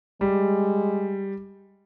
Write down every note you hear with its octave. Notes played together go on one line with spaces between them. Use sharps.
G3 G#3